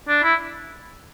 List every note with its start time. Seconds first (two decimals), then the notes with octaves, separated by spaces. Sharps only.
0.08 D4
0.23 E4